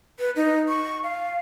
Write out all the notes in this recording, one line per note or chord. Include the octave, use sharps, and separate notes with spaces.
B4
D#4
C#6
F5